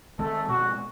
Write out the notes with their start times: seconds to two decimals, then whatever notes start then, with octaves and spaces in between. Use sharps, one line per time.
0.19 D#3 G#3 A3 C4 A4
0.48 B2 G#3 C4 F#4